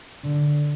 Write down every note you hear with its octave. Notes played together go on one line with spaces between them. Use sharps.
D3